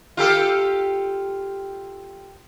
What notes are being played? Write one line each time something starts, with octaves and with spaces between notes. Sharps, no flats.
F4 G4 A4